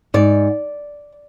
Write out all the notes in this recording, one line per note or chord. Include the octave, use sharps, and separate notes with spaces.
G#2 D5